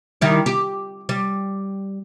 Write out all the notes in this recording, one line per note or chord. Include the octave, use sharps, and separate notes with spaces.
D#3 G3 E4
G4
G3